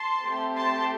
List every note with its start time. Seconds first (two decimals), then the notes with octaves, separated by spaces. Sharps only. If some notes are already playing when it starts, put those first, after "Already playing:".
Already playing: A5 C6
0.23 A3 C4 G4
0.56 A5 C6